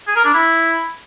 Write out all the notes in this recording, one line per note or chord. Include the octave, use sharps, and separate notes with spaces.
G#4
A#4
D4
E4